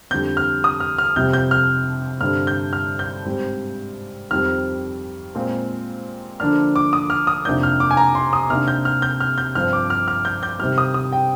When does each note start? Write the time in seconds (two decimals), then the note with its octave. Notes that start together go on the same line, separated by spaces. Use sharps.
0.10 F2 D3 G3 G6
0.37 F6
0.64 D#6
0.80 F6
0.98 F6
1.16 F2 C3 G3 G6
1.33 G6
1.51 F6
2.21 G2 D3 G3 C4 F6
2.47 G6
2.73 F6
2.99 G6
3.25 G#2 G3 C4
4.31 F2 D#3 G3 C4 F6
5.35 A#2 G#3 C4
6.40 D3 F3 A#3 D4 F6
6.76 D6
6.93 D#6
7.10 F6
7.27 D#6
7.45 F2 C3 D#3 A#3 D4 G6
7.63 F6
7.80 D6
7.91 G#5
7.97 A#5
8.15 C6
8.33 D#6
8.50 C3 D#3 A#3 D4 F6
8.68 G6
8.85 F6
9.02 G6
9.20 F6
9.38 G6
9.55 G2 F3 C4 F6
9.73 D6
9.90 F6
10.08 F6
10.25 G6
10.43 G6
10.59 C3 D#3 G3 C4 F6
10.78 D#6
10.94 D#6
11.13 G5